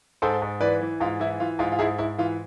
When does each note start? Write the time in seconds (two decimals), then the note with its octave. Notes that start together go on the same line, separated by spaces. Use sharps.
0.22 G#2 A4 C5
0.42 G#2
0.61 E3 B4 D5
0.81 E3
1.00 G#2 F4
1.20 E3 E4
1.40 E3 F4
1.59 G#2 F4
1.72 F4
1.79 G#2 E4 G#4
1.98 G#2 E4
2.18 E3 F4